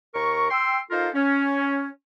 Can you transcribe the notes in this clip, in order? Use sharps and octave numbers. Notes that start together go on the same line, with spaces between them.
D#2 A#4 A#5 C#6
G5 C6 E6
D#4 F4 A4 A#4 C5 F5
C#4